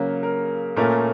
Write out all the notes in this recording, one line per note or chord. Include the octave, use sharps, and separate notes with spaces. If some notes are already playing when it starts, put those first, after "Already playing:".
Already playing: C#3 F#3 A#3
A#4
A#2 A3 C#4 A#4